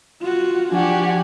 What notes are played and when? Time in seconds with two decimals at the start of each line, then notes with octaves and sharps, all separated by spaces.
0.20 F4 F#4
0.73 F3 D4 F#4 G4 G#5